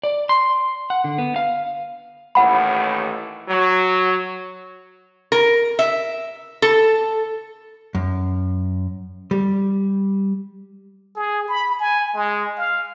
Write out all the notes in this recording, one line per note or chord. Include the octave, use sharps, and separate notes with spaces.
D5
C6
F#5
D3
B3
F5
A1 D#2 A2 F#5 B5
F#3
A#4
E5
A4
F#2
G3
G#4
B5
G#5
G#3
F5